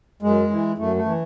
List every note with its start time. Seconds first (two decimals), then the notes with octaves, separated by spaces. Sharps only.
0.22 F#2 G#3
0.50 E3
0.78 F#2 A3
0.96 A3
1.06 E3